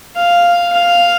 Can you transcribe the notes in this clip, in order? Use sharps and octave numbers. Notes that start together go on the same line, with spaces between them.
F5
F5